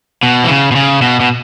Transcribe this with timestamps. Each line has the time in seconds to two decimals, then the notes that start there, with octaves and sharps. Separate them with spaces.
0.23 B2
0.44 E3
0.49 C#3
0.72 B2
0.75 C#3
1.02 B2
1.20 B2